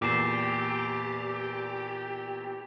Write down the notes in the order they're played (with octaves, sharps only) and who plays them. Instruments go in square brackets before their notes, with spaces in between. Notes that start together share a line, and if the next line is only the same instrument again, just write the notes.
[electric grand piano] E2 A#2 [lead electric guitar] G4 [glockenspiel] D6 C7 E7